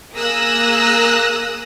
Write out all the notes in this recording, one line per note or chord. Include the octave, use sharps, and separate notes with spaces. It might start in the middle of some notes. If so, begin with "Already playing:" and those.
A#3 G#4 D#6 E6 F#6 A#6